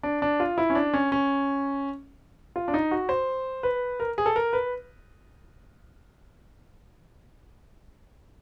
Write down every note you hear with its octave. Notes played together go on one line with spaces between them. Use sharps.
D4
D4
F4
E4
C#4
D4
C#4
C#4
F4
D4
D#4
F#4
C5
B4
A#4
G#4
A4
A#4
B4